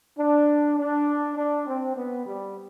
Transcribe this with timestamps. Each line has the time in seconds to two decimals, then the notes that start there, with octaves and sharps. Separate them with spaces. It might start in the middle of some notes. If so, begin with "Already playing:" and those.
0.18 D4
0.78 D4
1.37 D4
1.67 C4
1.96 B3
2.26 G3